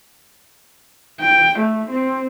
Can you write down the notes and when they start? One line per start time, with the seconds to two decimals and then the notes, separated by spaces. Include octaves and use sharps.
1.20 G5
1.59 A3
1.89 C4